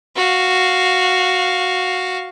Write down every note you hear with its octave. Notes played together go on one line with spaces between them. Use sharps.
F#4 F5